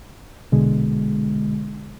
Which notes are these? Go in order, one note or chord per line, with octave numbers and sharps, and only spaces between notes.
A#1 B2 D3 G#3